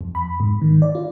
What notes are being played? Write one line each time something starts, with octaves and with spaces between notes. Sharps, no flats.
F2
B5
G#2
D#3
D5
F4